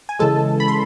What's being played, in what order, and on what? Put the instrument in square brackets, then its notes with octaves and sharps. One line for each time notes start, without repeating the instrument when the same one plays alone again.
[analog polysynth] G#5
C#3 E3 G#3 A4 A5
B5
C6